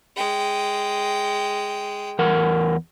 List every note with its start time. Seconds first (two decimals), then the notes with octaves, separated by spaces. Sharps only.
0.17 G#3 G5
2.19 E2 A#4 F#5